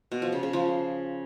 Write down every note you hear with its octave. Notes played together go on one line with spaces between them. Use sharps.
B2
F3
C#3
C#3
F3